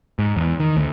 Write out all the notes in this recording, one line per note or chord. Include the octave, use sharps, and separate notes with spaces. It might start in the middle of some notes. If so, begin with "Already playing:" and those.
G#2
E2
D#3
D2